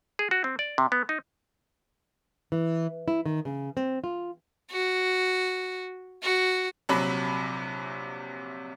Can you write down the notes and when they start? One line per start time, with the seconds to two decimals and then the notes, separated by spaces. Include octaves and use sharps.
0.19 G#4
0.31 F#4
0.44 C4
0.59 D5
0.78 C3
0.92 B3
1.09 D#4
2.52 E3
3.08 E4
3.26 D#3
3.45 C#3
3.77 C4
4.04 F4
4.71 F#4
6.23 F#4
6.89 A#1 C3 F#3 B5